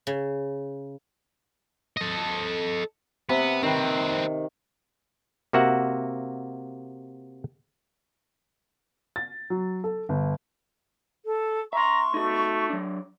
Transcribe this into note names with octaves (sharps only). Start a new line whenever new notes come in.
C#3
A4 D#5
C3 B3
D#3 C4 B4
C3 A#3 F#4 E5 F#5
A6
F#3
A4
G1
A4
E5 A#5 C6 C#6
A3 D#4 F#4
F#3 D4